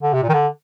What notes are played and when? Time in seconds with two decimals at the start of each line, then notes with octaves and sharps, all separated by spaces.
0.02 D3
0.13 C3
0.23 A#2
0.29 D#3
0.33 D3